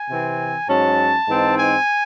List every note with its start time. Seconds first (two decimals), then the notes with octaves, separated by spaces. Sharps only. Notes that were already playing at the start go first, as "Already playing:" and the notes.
Already playing: G#5
0.09 C3 E3 C4
0.69 G#2 F#3 C#4 A5
1.28 G#2 E3 C4 D#4
1.58 G#5